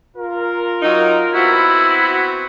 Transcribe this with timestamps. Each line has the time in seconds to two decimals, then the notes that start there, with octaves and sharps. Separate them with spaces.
0.17 F4 A#4
0.82 F#3 D#4
1.35 B3 C4 E4 F#4